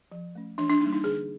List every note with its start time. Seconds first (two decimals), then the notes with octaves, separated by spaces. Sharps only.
0.12 F3
0.35 A3 C#4
0.58 E3 D4
0.69 D4
0.81 G3 A#3 D#4
0.92 D#4
1.04 D3 G#4